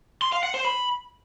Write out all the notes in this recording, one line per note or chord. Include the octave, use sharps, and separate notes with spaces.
C6
F5
F#5
C5
B5